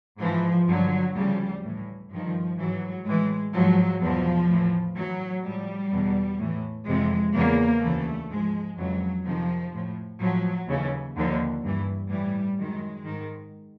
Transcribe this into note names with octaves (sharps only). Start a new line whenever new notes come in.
G#2 E3 F3
G2 D3 F3 F#3
D2 C#3 F3 G3
A2 E3
G2 D#3 F3
G#2 E3 F#3
A2 E3 G#3
G#2 F3 F#3
E2 B2 F3
A2 E3
A2 E3 F#3
A2 F3 G3
E2 B2
A2 E3
F2 C3 E3 G#3
E2 C#3 E3 A#3
D2 C#3 E3 A3
G#2 F3 G#3
F2 C#3 E3 F#3
F2 C3 D#3 F3
A2 F3
A2 F3 F#3
D#2 C#3 E3
D#2 D3 F3
G2 E3
A2 E3 G3
F#2 D#3 G#3
G#2 D#3